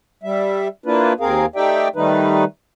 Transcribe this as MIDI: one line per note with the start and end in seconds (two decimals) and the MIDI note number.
0.23 0.68 55
0.23 0.68 76
0.86 1.13 58
0.86 1.13 62
0.86 1.13 64
0.86 1.13 65
0.86 1.13 71
1.20 1.46 39
1.20 1.46 60
1.20 1.46 68
1.20 1.46 70
1.20 1.46 77
1.56 1.88 57
1.56 1.88 63
1.56 1.88 67
1.56 1.88 74
1.56 1.88 76
1.56 1.88 79
1.96 2.44 51
1.96 2.44 55
1.96 2.44 57
1.96 2.44 63
1.96 2.44 71